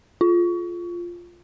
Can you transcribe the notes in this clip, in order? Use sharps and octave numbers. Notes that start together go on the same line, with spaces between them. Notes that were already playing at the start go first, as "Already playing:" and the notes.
F4